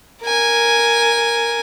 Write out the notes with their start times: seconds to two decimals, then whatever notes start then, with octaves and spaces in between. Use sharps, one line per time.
0.23 A#4 G#5